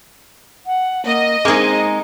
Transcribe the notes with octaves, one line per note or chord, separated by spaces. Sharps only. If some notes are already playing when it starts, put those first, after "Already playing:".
F#5
A#3 D#5
G#3 A#3 C4 D#4 G#4